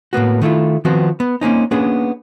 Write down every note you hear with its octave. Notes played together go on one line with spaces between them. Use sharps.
A2 A#3 B3 F#4
D#3 A3 E4 F4
D#3 F3 B3 C4 F#4
B3
A#3 C4 C#4 D#4
A#3 B3 C#4 D4 G#4